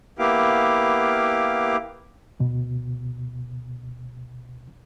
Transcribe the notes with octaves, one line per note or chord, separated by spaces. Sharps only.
A#3 B3 E4 G4 F5 D6
D2 B2